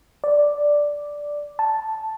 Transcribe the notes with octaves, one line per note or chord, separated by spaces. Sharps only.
D5
A5